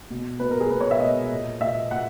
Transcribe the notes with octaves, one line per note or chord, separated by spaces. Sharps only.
B2
B2 B4
A#4
G#4
B2 B4
C#5
E5
B2 D#5
A#2
A#2 E5
A#2 F#5